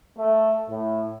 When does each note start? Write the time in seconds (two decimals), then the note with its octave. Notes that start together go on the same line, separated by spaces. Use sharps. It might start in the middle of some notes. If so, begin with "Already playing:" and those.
0.18 A3
0.69 A2